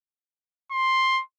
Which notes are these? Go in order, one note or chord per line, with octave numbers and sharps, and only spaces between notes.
C6